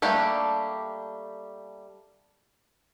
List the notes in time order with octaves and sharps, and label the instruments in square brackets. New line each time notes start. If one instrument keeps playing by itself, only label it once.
[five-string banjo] G3 A3 A#3 D4 G4